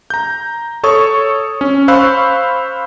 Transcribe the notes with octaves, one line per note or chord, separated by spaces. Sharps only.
A#5 G6
A4 C#5 C#6 D#6
C#4
C5 F5 B5 C#6 E6 F#6